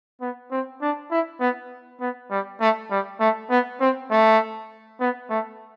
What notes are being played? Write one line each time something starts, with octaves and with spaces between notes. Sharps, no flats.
B3
C4
D4
E4
B3
B3
G3
A3
G3
A3
B3
C4
A3
B3
A3